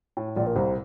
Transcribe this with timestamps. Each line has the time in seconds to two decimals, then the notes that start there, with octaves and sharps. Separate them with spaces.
0.17 A2
0.36 A#1 A#2 D5
0.47 A#4
0.56 C2 C3 C5